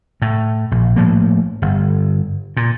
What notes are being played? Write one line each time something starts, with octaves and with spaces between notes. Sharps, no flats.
A2
A#1
A2 F3 A#3
G1
A#2